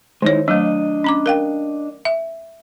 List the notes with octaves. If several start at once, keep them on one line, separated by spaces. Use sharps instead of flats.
D#3 G#3 D#4 E4 C#5
F#3 A3 D4 D#5
C#4 A#5 D6
A#4 F5 G5
E5